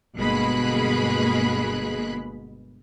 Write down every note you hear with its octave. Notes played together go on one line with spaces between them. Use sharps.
G1 B2 G#3 A#3 B5 F#6